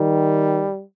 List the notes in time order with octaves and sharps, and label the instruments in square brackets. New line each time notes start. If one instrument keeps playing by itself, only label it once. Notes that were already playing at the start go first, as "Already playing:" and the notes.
Already playing: [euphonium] D#3 [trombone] G3